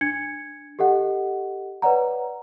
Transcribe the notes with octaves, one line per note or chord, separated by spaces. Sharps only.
D4 G#6 C#7
G4 A4 D#5 F#5
B4 C#5 D5 F#5 A#5